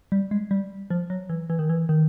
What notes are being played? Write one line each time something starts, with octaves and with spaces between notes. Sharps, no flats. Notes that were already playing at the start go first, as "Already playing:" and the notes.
G3
G#3
G3
F3
F#3
E3
E3
D#3
E3
D#3